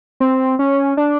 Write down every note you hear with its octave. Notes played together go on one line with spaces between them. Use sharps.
C4
C#4
D4